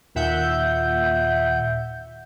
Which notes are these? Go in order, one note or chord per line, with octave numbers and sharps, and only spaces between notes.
D#2 A#2 E5 F#5 G6